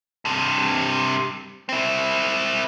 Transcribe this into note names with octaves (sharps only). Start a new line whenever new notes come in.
G2 C3
C4 E4